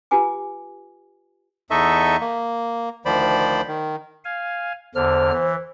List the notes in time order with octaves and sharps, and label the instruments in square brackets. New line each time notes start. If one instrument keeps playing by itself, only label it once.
[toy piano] F4 G4 B4 G#5 D6
[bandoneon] E2 D#4 A4 D#5 E5 C#6
A#3
D2 D#3 F3 C5 D5 B5
D#3
[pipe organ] F5 G#5
[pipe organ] E2 D3 F6 [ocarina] C5
[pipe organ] E3